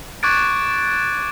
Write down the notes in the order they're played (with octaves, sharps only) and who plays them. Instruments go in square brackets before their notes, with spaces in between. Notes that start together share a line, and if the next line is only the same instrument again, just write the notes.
[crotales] C#6 D6 F#6 G#6 A6 D7